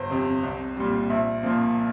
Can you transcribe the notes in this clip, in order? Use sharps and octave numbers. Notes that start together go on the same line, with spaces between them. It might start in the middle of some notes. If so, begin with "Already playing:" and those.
Already playing: G1 C5
F2 C3
C2
A#2 G3
A#1 E5
A#2 F3 A#3